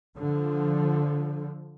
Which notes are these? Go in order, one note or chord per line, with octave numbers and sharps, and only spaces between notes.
D3 F3